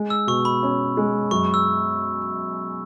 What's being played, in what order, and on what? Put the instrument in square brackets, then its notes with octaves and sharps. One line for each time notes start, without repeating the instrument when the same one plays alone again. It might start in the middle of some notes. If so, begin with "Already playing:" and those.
Already playing: [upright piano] G#3
[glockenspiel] E6
[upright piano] B2 [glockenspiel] C#6
[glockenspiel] B5
[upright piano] C#4
G#3
[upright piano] F#2 [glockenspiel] C#6
[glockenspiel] E6